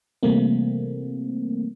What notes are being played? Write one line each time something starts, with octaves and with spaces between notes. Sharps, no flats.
C3 E3 G3 A3 A#3 C4